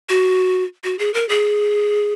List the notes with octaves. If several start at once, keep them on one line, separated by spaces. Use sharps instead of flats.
F#4
F#4
G#4
A#4
G#4